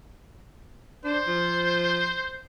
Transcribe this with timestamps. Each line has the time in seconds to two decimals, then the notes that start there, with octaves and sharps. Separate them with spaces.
1.05 D4 C5
1.27 F3